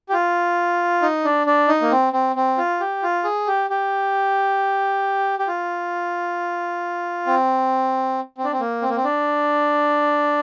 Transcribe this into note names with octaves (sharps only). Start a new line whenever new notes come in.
G4
F4
D#4
D4
D4
D#4
A#3
C4
C4
C4
F4
G4
F4
G#4
G4
G4
G4
F4
C4
C4
D4
C4
A#3
C4
A#3
C4
D4